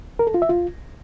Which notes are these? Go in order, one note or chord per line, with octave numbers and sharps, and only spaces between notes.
A#4
A4
F4
E5
F4